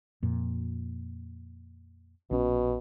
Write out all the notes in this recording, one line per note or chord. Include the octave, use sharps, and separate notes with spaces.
F2 A#2
A#1 B2 C#4